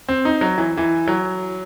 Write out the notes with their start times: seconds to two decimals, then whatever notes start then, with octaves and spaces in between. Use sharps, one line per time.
0.09 C4
0.25 D#4
0.41 F#3
0.58 E3
0.77 E3
1.08 F#3